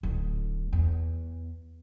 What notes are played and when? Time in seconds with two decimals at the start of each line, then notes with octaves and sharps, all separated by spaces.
0.03 D1 D2
0.73 E2